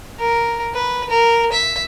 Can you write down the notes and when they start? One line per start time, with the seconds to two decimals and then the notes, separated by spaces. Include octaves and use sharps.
0.19 A#4
0.74 B4
1.10 A#4
1.52 E5